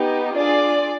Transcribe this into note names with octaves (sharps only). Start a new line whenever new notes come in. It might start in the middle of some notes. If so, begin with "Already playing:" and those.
Already playing: B3 D#4 G4
D4 F4 G#4 D5